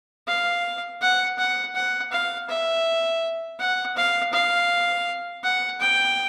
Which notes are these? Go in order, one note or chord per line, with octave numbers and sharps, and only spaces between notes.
F5
F#5
F#5
F#5
F5
E5
F#5
F5
F5
F#5
G5